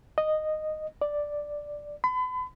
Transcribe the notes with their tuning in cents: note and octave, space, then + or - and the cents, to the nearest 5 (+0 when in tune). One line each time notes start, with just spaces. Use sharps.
D#5 -10
D5 +0
B5 +40